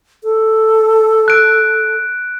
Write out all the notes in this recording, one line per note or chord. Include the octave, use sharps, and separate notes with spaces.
A4
F#6 D7